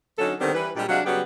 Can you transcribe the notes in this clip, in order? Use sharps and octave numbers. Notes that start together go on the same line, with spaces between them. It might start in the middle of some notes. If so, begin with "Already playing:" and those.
D3 F#3 C#4 D#4 A4
D3 D#3 G3 B3 C4
E3 G3 B4
A#2 G3 G#3 C4 D4 G4
C3 F#3 G#3 D4 F5 F#5
C#3 F#3 G3 B3 G4